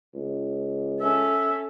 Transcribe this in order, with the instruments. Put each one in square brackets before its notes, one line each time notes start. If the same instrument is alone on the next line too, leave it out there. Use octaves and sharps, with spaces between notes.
[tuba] C#2
[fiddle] C#4 [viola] A4 [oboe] E5